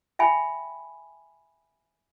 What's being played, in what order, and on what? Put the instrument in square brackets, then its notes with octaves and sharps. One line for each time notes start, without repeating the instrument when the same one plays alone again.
[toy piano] E5 G5 G#5 B5